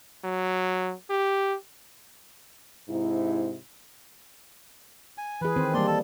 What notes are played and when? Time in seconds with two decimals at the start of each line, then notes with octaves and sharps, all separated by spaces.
0.24 F#3
1.10 G4
2.89 G#2 C3 D#4 E4
5.18 G#5
5.41 E3 G#4 B4
5.56 D#3 C4 C5
5.74 G3 A#3 D4 D5 C6
5.87 A4 A5